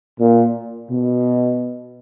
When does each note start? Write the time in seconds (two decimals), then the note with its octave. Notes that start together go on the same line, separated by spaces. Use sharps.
0.20 A#2
0.91 B2